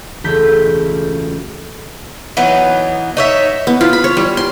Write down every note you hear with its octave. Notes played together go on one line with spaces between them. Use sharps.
E1 C#2 A3 G6 B6
E3 F#3 B3 D#4
D#4 C#5 E5
B3
F4
B5
C#5
G3
C6